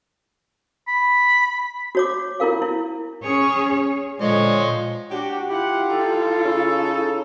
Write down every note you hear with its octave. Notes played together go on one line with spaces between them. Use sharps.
B5
F#4 C#5 D6
E4 F4 A#4 F5
E4
C#4 G#4 C#5
A#2 D3 F3 G#3 C5 C#5 D#5
D4 F#4 G4
E4 F4 G4 F#5
D#4 E4 A4
C#3